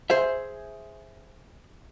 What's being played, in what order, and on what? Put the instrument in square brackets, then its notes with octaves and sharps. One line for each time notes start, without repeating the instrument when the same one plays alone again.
[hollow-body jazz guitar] G#4 C5 E5